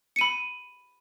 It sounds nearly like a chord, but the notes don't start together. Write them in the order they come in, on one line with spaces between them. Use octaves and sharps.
C#7 D#7 B5